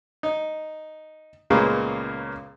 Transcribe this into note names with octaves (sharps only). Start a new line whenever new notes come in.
D#4
C#2 A#2 C#3 G#3 A#3 B3